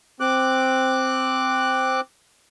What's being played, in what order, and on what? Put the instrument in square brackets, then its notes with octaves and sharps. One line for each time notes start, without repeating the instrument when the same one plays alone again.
[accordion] C4 D6 F#6